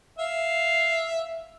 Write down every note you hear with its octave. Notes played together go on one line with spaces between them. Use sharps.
E5 F5